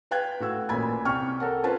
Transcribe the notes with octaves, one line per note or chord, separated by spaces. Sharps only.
B4 F5 G5 F#6 G#6
A2 F#4 E6
A1 A#2 G#5 B5 G#6
C2 G5 C#6 F6
A4 A#4 F#5
C4 C#4 F4 B4 A5